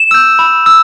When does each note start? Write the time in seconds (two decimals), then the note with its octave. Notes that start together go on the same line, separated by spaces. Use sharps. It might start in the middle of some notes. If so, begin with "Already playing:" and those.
Already playing: E7
0.11 E6 G6
0.39 B5
0.66 E6